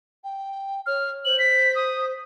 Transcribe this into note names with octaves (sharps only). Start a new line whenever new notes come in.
G5
C#5 F6
C5 F#7
B6
D#6